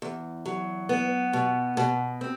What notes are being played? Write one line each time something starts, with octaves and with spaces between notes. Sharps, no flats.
E2
F#3
B3
B2
B2
C4